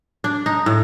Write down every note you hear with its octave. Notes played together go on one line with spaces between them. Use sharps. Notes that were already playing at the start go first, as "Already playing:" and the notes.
D4
D#4
A2